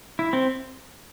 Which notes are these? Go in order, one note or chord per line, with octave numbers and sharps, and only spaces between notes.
E4
C4